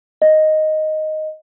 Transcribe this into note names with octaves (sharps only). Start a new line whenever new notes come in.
D#5